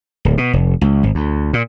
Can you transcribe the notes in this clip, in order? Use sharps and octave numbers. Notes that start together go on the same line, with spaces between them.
D1
B2
F1
C#2
G#1
D2
A#2